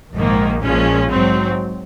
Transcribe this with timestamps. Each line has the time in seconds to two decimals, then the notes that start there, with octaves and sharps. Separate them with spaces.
0.15 A#1 G#2 D#3 A#3
0.63 A#1 A#2 F3 G#3 C#4
1.10 G#2 F#3 C4